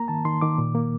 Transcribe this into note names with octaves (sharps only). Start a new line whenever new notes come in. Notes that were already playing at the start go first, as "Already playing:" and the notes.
Already playing: A#3 A#5
D#3 A5
D#3 C6
D#3 D6
A#2
A#3